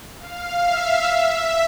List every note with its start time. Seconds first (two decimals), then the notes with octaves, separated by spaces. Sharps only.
0.18 F5
0.63 E5
1.06 E5